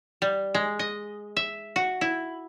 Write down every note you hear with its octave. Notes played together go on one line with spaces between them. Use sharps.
G3
G#3
D#5
E5
F#4
E4